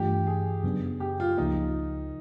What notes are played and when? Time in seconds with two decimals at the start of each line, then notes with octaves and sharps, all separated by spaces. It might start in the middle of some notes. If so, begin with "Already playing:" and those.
Already playing: G2 E3 A3 D4 F4 G4
0.27 G#4
0.63 F#2 C#3 F#3 B3 D4
1.00 G4
1.20 F4
1.38 C#2 C#3 F3 A#3 D#4